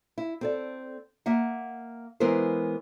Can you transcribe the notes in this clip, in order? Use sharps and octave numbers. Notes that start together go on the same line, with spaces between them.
E4
C4 A4 D5
A#3 E5 F#5
E3 G#3 B3 E4 A#4 C5